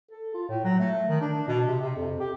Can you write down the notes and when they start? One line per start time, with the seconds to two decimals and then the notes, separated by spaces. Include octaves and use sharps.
0.11 A4
0.34 F4
0.49 A2
0.64 F#3
0.79 A3
1.08 D#3
1.21 D4
1.48 B2
1.68 C3
1.80 C3
1.96 F2
2.20 G4